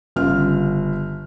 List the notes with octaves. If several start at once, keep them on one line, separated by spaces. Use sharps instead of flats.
G1 C#3 F4 F6